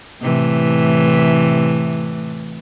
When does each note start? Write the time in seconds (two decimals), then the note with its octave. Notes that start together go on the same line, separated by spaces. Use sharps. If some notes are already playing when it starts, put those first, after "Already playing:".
0.22 A2 C3 E3